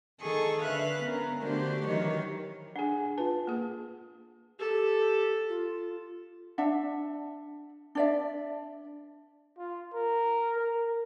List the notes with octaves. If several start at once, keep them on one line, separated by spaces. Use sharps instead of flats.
D#3 G#4 A4 C#6 D#6
D3 B4 E5 F5 F#6
B3 C#4 A#4
D3 A3 D4 F#4 G4 C5
D#3 E3 F#3 F#4 G4 C#5
D4 G#4 F#5 G#5
F4 B4 A5
A#3 G#4
G4 A4
F4
D4 E5 F#5
D4 D5 E5
F4
A#4
A#4